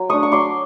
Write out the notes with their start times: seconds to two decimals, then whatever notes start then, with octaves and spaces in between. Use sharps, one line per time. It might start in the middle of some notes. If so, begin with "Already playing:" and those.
Already playing: F#3
0.09 A3 D4 C#6 D#6
0.23 C#6
0.32 F#3 C6 D6